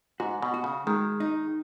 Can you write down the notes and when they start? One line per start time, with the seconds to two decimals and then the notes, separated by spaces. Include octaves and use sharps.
0.20 G#2 F#4
0.42 B2
0.54 F#4
0.64 C#3
0.87 D#3 G#3
1.20 D#4